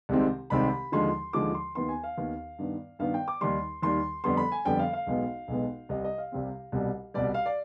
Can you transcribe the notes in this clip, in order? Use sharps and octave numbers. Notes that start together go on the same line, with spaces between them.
C2 C3 D#3 G#3 C4
C2 C3 D#3 G#3 C4 B5
D#2 D3 F3 G#3 C6
D#2 D3 F3 G#3 D6
C6
D#2 D#3 B3 C6
G#5
F5
D#2 D#3 B3
G2 D#3 B3
G2 D#3 B3 F5
G5
D6
D#2 D#3 G3 C6
D#2 D#3 G3 C6
F2 D3 G3 B3 C6
B5
G#5
F2 D3 G3 B3 G5
F5
F5
B1 B2 G#3 B3
B1 B2 G#3 B3
C2 C3 G3 C4 D#5
D#5
F5
C2 C3 G3 C4
C2 B2 G3
C2 B2 G3 D5
F5
D5